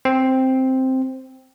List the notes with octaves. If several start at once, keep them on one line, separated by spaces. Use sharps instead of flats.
C4